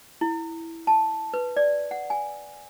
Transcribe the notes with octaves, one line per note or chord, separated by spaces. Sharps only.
E4
A5
B4
D5
F#5
G#5